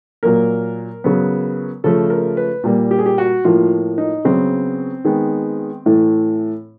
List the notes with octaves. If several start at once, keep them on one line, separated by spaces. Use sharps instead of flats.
A#2 F#3 A#3 A#4
C#3 F#3 B3
C#3 F3 A3 A4
A#4
B4
A#2 G3 A#3
G4
G#4
G4
F#4
A2 F3 A#3 F4
D#4
C#3 F#3 B3 C4
D#3 G#3 B3
A2 E3 A3